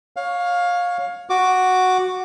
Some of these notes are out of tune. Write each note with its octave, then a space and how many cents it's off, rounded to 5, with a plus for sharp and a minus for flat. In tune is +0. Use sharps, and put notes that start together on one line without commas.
C#5 +0 F5 +20
F#4 +0 D6 +0